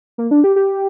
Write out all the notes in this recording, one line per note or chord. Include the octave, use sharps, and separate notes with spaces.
A#3
D4
G4
G4